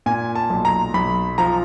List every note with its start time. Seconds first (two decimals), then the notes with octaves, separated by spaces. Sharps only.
0.06 A#2 G#5
0.35 A5
0.50 B1
0.65 A#5
0.94 B1 B5
1.38 F3 A#5